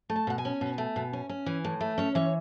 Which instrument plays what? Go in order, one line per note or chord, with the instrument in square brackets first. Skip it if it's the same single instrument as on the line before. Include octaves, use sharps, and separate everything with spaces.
[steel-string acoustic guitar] A3
A5
B2 F#5
G#5
C#4
B2
A3
B2
C#4
C#4
E3
A2
A3
C#4 C#5
E3 C#5